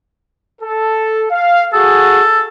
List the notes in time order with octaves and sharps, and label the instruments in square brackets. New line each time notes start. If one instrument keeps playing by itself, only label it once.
[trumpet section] A4
F5
[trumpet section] F#4 G#4 [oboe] A4